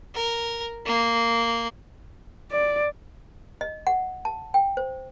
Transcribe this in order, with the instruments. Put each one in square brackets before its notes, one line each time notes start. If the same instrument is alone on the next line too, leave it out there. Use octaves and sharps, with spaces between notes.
[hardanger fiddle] A#4
A#3
[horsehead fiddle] D5
[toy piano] D#5
F#5
A5
G5
C5